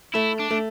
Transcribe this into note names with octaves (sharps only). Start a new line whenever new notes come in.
A3 E4
D4
A3